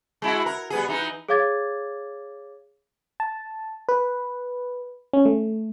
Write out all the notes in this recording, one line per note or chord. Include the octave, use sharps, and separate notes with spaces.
G#3 E4 F#4
A#4
G3 B3 G#4
E3 D#4
G#4 C#5 F5 D6 G#6 A6
A5
B4
C#4
A3